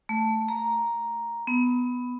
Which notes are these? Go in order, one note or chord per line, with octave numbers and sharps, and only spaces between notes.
A3
A#5
B3